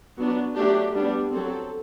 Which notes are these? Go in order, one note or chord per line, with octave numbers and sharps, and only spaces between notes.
F#3 B3 D4 F#4
F#3 A3 D4 G4
G3 B3 D4
F#3 C4 A4